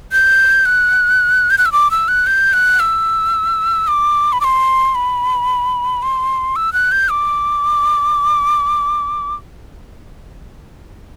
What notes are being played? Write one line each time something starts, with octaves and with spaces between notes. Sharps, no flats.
G6
F#6
G6
F#6
E6
D6
E6
F#6
G6
F#6
E6
D6
B5
D6
C6
B5
C6
E6
F#6
G6
D6